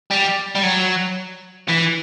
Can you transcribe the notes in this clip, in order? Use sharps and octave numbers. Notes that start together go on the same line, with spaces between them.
G3
G3
F#3
E3